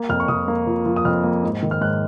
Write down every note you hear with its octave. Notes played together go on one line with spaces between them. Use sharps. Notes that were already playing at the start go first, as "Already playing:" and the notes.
Already playing: A#3
F2 F6
C#6
F2 D#6
A#3
F3
F3
D#6
F2 F6
A#3
G#2
D#3
F6
G#2 F#6